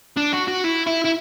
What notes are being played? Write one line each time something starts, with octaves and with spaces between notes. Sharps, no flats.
D4
F#4
F#4
E4
E4
E4